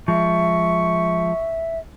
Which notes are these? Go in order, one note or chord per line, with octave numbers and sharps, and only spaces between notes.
F3 G#3 E5 C#6